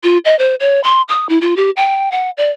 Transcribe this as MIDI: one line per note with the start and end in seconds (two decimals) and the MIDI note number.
0.03 0.18 65
0.25 0.37 75
0.39 0.55 72
0.60 0.82 73
0.84 1.02 84
1.09 1.27 87
1.29 1.39 64
1.41 1.56 65
1.57 1.70 67
1.77 2.11 79
2.12 2.30 78
2.37 2.50 74